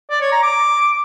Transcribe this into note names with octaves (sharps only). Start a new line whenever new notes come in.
D5
C#5
A#5
D6